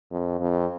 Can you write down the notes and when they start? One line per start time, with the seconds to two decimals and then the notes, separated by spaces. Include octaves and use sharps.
0.11 F2
0.40 F2